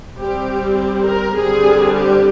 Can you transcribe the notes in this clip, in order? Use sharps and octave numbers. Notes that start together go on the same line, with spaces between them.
G3 C4 G4
G4
A#4
D3 G3 C4 G#4
G4